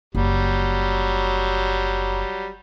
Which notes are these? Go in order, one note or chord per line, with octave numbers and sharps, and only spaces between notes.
F#1 F#3 G3